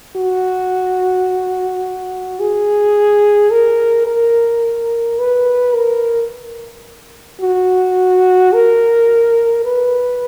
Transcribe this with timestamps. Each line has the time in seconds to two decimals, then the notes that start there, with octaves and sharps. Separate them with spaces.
0.16 F#4
2.40 G#4
3.51 A#4
4.07 A#4
5.19 B4
5.74 A#4
7.41 F#4
8.54 A#4
9.65 B4